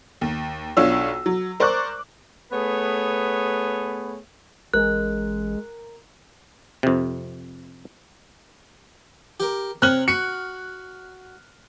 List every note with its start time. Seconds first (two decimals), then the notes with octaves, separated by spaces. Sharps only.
0.21 D#2
0.77 B1 D4 F4 C#5 E6
1.26 F#3
1.60 A#4 C5 D5 C#6 D6 F#6
2.52 A3 B3 G#4 B4 C#5
4.74 A1 G#3 A#4 F#6
6.83 F2 C3
9.40 G4 A#4
9.82 C3 C4 C#5 F6 F#6 F#7
10.08 F#4 C#7